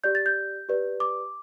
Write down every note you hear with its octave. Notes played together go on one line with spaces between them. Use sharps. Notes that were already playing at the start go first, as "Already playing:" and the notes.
G4 D5 G6
A6
G6
G4 B4 D5
D6